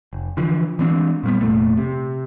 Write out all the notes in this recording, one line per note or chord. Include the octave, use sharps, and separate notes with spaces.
F1
D3 E3 F3
E3 G#3 C4 D4
A#2 G3 B3
F1 A#2 A3
C3